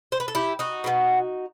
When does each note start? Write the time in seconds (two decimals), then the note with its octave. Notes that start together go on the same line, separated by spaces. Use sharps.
0.12 C5
0.20 B4
0.28 A4
0.35 E4 G4
0.59 D#4 F#4
0.84 B2 G3 B3